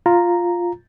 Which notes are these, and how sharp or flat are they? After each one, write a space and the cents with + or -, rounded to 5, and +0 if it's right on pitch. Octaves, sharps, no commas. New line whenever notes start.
F4 +0 A#5 +0